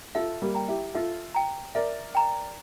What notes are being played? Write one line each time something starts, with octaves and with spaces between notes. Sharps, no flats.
F4 A4 E5
G3 A#3
G5 A#5
E4 G4
F4 A4 E5
G5 A#5
A#4 D5 E5
G5 A#5